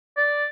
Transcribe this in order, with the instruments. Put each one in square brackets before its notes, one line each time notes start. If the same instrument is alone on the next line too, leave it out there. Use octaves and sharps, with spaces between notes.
[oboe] D5